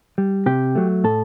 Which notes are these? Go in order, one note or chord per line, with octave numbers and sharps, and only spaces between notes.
G3
C3 G4
F#3 A3
A2 A4